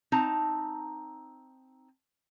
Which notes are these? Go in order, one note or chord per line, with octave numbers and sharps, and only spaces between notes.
C4 D#4 A5 A#5